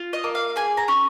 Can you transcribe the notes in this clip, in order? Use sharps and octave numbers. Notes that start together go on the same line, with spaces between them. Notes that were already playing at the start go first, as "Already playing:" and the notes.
Already playing: F4
D#5
A#3
F5
G#4 G#5
A#5
C#4